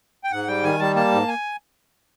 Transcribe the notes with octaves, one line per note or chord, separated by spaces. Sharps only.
G5
G#2 F#5
G3 G5
D#3 G#5
G3 A5
A#3 A5
G#2
G#5